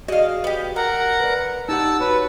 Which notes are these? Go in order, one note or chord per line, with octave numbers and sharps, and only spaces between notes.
F#4 G#4 D5 D#5 F5
B3 G4
A#4 F#5 A#5
B4 D5
D#4 G4 F#5 A5 E6
F#4 B4 C#5